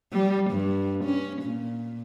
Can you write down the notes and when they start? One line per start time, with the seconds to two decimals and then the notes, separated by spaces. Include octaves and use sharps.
0.13 G3
0.50 G2
1.04 C#4
1.42 A#2